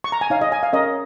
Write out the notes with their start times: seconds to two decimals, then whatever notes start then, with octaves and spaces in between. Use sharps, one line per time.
0.04 C#6
0.12 A#5
0.21 G#5
0.30 D#4 C#5 F5
0.41 D#5
0.52 G#5
0.63 F5
0.73 C#4 A#4 C#5 D#5